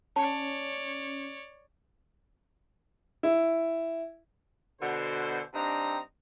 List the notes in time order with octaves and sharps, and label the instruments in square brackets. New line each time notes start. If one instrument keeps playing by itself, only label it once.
[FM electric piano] C#4 [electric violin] C#5 D5 [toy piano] A5
[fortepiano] E4
[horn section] B2 D3 C5
G2 C4 D4 D#4 A#5